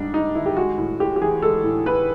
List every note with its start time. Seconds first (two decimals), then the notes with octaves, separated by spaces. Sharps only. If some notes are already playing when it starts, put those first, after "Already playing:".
Already playing: G#2 G3 D4 D#4
0.14 G#2 D#4
0.35 D#3 E4
0.46 G4
0.57 G#3 F#4
0.78 A2
1.00 A2 G4
1.16 G4
1.21 E3 G#4
1.42 G#3 A4
1.64 A2
1.86 A2 B4